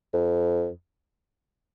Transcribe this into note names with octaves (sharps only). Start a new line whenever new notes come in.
F2